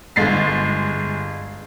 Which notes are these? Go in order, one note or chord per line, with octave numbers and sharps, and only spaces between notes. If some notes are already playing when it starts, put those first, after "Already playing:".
G1 G#3 A6 C7